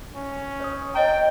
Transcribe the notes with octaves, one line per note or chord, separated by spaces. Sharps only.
C#4
C#5 D#6
C#5 D#5 G5 A#5